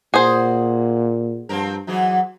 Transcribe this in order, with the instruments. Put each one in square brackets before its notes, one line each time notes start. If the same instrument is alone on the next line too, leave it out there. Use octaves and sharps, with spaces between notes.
[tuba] A#2 [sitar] F#4 [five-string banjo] G#4 C5
[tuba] G2 [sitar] F3 C4 A#4
[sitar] G#2 E3 G#4 [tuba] F#3